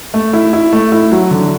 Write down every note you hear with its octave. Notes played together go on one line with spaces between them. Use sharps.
A3
E4
E4
A3
E4
F#3
D3